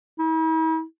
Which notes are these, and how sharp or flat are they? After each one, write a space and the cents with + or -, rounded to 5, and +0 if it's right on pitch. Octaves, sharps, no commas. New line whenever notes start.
E4 -45